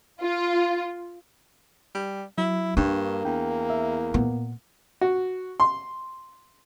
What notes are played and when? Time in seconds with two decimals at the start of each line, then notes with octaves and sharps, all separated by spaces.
0.21 F4
1.95 G3
2.38 F#3 E4
2.77 G2 A#3 D4 C#6
3.25 E2 G5
3.70 E5
4.14 A#2 B3
5.01 F#4
5.60 C6